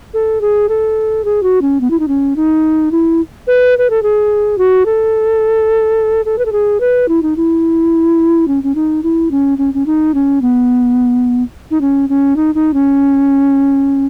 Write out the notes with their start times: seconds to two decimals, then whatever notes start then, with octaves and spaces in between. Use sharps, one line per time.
0.14 A4
0.41 G#4
0.69 A4
1.25 G#4
1.43 F#4
1.61 C#4
1.81 B3
1.90 E4
1.99 D#4
2.08 C#4
2.36 D#4
2.91 E4
3.47 B4
3.78 B4
3.90 A4
4.03 G#4
4.58 F#4
4.85 A4
6.25 A4
6.38 B4
6.45 A4
6.52 G#4
6.80 B4
7.08 E4
7.22 D#4
7.37 E4
8.48 C#4
8.63 C#4
8.75 D#4
9.03 E4
9.31 C#4
9.58 C#4
9.74 C#4
9.86 D#4
10.14 C#4
10.42 B3
11.71 D#4
11.81 C#4
12.09 C#4
12.36 D#4
12.55 D#4
12.74 C#4